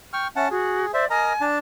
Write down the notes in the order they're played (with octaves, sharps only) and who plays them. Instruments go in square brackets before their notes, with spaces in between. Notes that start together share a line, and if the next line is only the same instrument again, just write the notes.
[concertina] G5 C#6 F6
[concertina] C#4 F#5 A5 [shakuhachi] E5
[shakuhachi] F#4 [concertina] G#4
[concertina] C5 E5 [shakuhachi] D5
[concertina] A#4 D#5 A#5 [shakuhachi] G#5
[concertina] D4 A5